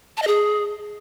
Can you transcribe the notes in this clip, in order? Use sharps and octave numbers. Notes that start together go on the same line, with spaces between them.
A5
D#5
G#4